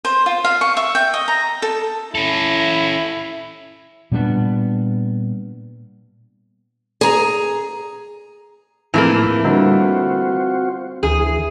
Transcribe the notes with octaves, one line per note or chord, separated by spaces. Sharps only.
C5
F4
F5
C#6
E5
G5
D#5
A#5
A4
C#4 E4 A4
A#2 G3 B3 D4
G#4 A#5
A2 E3 F3 A3 A#3 C4 E4 G#4
D3 G3 C4 D4 F4 F#4
D2 E3 G#4